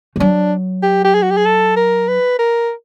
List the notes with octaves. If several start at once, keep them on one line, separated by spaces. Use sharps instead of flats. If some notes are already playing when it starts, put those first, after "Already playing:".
F3
F#3 D4
G4
G4
G#4
F#4
G4
G#4
A4
A#4
B4
A#4